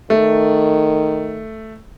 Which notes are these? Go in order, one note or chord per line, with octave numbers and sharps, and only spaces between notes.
D#3 A3